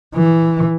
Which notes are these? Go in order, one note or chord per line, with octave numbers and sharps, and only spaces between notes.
E3